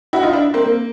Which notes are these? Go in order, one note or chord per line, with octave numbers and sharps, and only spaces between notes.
E4 F#4
D#4 F4
D4 E4
A#3 C4
A#3